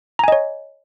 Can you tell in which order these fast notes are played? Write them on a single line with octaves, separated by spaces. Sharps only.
A#5 G#5 D#5 C#5